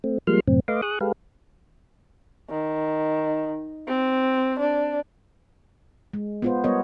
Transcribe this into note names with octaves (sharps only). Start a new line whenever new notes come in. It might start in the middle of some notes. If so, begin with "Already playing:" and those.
A3 C4
F3 G3 G#3 A#3 C6 F6
F#2 A2 C3 C4
A3 B4 D#5 F5 C6 D6
G#4 C#6 D#6 F#6
G#3 G4 A4 B4 F5
D#3
C4
D4
G#3
B3 F4 C5
G3 B3 A#4 C#5 D#5